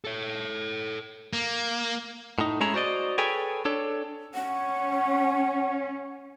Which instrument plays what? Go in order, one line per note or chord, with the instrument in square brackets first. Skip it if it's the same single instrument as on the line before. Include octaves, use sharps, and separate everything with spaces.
[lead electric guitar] A4 C#5
[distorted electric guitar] A#3
[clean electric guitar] A2 D#4
G#3 A3 C#4 E4 G#4 A#5
F#4 C5 D5 D#5
G#4 A4 B4 C#5 G5 G#5
D4 A4 C#5
[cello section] C#4 [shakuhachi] F#5